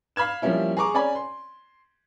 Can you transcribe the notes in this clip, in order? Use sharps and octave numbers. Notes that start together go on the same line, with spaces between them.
F5 B5 F6 G#6 E7
F3 G3 A#3 C#4 E4
G#4 A#5 C#6 D6
C#4 D5 G#5 B5
C6